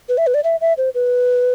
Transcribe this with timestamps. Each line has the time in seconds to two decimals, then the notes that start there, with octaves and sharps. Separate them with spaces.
0.09 B4
0.18 E5
0.27 B4
0.34 D5
0.44 E5
0.61 E5
0.78 C5
0.95 B4